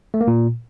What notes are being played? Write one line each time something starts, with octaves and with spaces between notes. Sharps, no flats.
A3
A#3
A#2